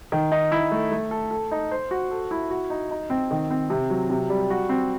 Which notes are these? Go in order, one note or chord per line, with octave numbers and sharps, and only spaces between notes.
D#3
D#4
E4
A3
A3
A4
A4
D#4
C5
F#4
A4
E4
F#4
D#4
D#4
C4
D#3
C4
C3
F#3
C3
G3
F#4
C4